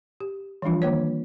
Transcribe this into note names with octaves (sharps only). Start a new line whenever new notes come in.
G4
E3 F3 G3 D4 F4
D#3 A#3 B4 C#5